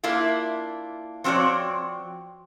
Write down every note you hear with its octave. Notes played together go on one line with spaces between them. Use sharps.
A#3 D4 E4 F4
F3 C4 F#4 C#5 D5